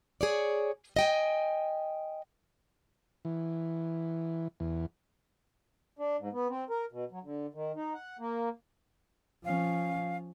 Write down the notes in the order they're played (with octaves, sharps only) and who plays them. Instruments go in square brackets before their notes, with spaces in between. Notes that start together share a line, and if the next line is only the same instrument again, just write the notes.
[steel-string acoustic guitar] G#4 C#5 D5
D#5 G5 G#5
[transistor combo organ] E3
E2
[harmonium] D4
G#2
B3
C4
A#4
B2
F#3
D3
D#3
D#4
F#5
A#3
[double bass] F3 C#4 [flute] F5